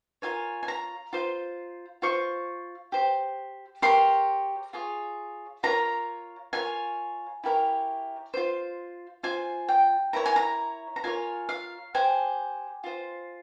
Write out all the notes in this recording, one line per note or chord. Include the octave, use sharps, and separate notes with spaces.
F4 A#4 C#5 G#5
G#5
A#5
F4 C5
F4 C5 C#6
G4 C5
G4 A#4 C#5 C6
F4 G#4 C#5
F4 A#4 C#5 A#5
F4 A#4 C#5 G#5
E4 G4 A#4 C#5
F4 C5
F4 C5 G#5
G5
E4 A#4 C#5 A#5
G#5
A#5
A#5
F4 A#4 C#5 G#5
F5
G4 C5 G#5
F4 C5